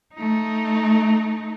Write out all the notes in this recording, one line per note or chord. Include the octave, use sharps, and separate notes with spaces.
A3 D#4